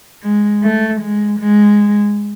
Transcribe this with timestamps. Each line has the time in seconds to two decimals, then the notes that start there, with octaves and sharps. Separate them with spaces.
0.23 G#3
0.63 A3
1.02 G#3
1.40 G#3